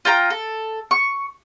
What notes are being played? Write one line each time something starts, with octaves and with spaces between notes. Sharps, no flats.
F4 G5 A#5
A4
C#6